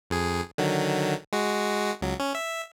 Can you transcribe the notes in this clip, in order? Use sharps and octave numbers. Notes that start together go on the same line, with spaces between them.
F2 G#4
D3 D#3 F#3
G#3 F#4
C#2 F#3
C#4
E5